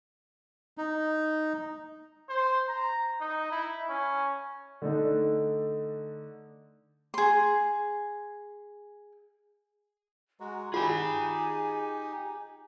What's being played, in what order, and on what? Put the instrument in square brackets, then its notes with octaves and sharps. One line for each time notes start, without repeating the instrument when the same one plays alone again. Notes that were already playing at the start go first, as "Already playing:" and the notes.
[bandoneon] D#4
[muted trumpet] C5
A#5
D#4
E4
C#4
[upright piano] D3 A3 D4 D#4
[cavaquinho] G#4 C6
[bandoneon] G#3 F#4 [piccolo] A#5
[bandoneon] D#4 G4 [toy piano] F4 [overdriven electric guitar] G#4 B5 [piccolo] G#5